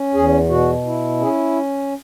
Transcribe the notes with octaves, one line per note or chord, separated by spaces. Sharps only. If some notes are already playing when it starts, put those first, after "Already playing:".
Already playing: C#4
E2 G#4
B2 F#4
E4
C#4 G#4